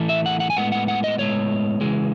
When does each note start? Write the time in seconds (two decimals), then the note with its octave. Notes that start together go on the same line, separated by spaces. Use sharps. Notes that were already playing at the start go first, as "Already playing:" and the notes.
Already playing: A2 E3 A3
0.09 E5
0.26 F#5
0.40 F#5
0.50 G#5
0.56 A2 G#3 B3 F#5
0.72 F#5
0.88 F#5
1.04 D#5
1.18 A2 G#3 B3 C#5
1.81 C#3 E3 G#3